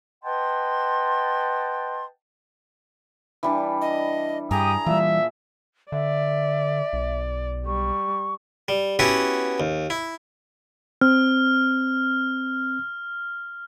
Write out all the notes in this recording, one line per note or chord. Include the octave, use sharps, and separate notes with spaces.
B4 D#5 F#5 G5 A5 C6
E3 G3 D4
D#5
G2 G4 G#4 A#5 D#6
A#2 E3 G3 E5
D3 D5 E5
B1
G3 C#6
G3
B3 C#4 E4 F#4 G4 B4
D#2
E4
C4 F6